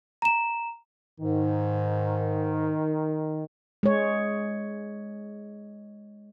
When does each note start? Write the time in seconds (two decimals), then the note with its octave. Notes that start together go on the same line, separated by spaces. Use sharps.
0.22 A#5 E7
1.20 G#2 D#3
3.83 G#3 C#5